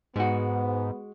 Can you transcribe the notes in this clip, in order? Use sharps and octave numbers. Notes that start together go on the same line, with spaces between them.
G#2 G#3 B3 F#4